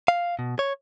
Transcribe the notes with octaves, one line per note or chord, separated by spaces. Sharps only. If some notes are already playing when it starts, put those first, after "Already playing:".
F5
B2
C#5